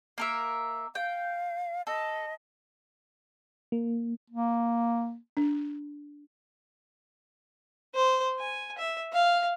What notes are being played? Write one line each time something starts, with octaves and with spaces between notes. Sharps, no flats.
A#3 A#4 E5
F5 G5
A4 D#5
A#3
A#3
D4
C5
G#5
E5
F5